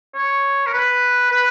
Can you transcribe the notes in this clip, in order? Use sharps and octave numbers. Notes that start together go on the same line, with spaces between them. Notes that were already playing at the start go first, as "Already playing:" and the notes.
C#5
A#4
B4
B4